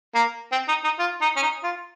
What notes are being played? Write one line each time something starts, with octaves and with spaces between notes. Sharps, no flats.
A#3
C4
D#4
D#4
F4
D#4
C#4
D#4
F4